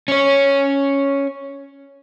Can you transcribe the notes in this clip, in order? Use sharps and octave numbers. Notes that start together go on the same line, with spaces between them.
C#4 C#5